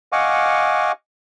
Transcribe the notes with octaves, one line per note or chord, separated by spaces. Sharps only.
D#5 F5 F#5 G#5 C#6 D6